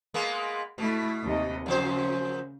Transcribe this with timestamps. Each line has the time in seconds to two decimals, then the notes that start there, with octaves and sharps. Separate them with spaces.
0.14 G#3 A#3 B3
0.78 B2 A3 E4
1.23 D#2 C3 D#5
1.66 F#2 C#3 F3 C5